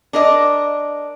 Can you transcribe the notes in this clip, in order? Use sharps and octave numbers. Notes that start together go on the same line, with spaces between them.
D4 A#4 D#5